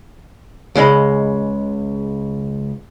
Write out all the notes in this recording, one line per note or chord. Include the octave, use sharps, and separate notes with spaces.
C#2 G#3 D#5 B5